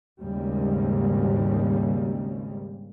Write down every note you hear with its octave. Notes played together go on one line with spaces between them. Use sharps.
G#1 D#2 G#2 C#3 G3